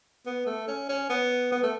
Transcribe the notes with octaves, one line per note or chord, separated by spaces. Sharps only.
B3
A3
C#4
C#4
B3
B3
A3